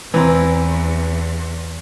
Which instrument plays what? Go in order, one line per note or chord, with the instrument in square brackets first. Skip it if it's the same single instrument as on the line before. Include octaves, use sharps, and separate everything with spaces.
[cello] E2 [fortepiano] E3 C4 A#5